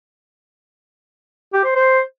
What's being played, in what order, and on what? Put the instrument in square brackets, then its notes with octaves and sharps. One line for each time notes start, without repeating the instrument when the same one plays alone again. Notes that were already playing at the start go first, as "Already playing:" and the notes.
[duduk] G4
C5
C5